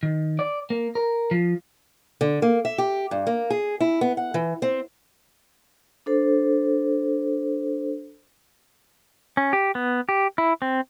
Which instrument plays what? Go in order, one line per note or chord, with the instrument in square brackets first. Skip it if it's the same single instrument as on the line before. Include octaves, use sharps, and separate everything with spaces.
[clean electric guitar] D#3
D5
A#3
A#4
F3
[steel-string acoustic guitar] D3
A#3
E5
G4
G2
A#3
G#4
E4
B3
F#5
E3
C4
[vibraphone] D4 A4 C5
[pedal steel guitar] C#4
G4
B3
G4
E4
C4